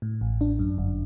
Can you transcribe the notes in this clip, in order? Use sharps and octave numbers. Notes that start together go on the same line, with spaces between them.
A2
A1
D4
F#2
G1